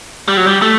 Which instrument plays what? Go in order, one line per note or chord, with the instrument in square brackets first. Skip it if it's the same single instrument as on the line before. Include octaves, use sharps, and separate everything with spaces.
[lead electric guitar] G3
F#3
G3
A3